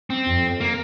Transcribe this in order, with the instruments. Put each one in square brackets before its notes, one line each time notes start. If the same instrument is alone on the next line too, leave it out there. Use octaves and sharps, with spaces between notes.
[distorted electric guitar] C4
[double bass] F2
[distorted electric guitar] A#3